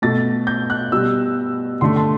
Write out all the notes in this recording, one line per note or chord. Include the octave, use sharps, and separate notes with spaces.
B2 A3 A6
G6
F#6
B2 G3 E6
D3 A3 C6
A5